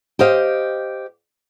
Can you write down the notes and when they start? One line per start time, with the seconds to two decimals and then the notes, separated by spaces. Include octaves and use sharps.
0.19 G4 C5 D#5 F5